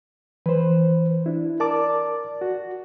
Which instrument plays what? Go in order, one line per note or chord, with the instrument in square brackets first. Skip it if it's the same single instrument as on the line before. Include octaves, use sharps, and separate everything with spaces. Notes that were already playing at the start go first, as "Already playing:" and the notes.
[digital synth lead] E3 [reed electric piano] B4 C5
[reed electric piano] D4 E4
[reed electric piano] A#4 A5 D6 [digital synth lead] D5
[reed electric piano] F#4